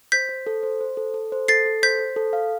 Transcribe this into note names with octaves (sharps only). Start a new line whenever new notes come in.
C5 G6 B6
C5
A4
C5
C5
A4
A4
C5
A4 A6 C7
A4
C5 G6 B6
C5
A4
F5